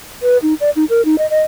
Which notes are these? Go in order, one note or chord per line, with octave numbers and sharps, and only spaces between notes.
B4
D#4
D5
D#4
A#4
D#4
D#5
D#5